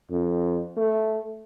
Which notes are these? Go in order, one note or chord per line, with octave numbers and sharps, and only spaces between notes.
F2
A3